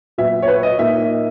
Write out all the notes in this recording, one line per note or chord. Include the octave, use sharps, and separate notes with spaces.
A#2 F#3 B3 E5
C#5
B4
D#5
A#2 A#3 D#4 E5